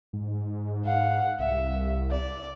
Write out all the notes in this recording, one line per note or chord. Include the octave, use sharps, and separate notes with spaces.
G#2
G#2 F5 F#5
C2 E5
D5